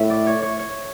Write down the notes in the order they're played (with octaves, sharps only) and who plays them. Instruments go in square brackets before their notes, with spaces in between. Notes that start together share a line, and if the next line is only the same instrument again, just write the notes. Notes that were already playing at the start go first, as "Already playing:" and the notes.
Already playing: [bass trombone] A2 [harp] E5
[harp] D5
C#5
C#5
C#5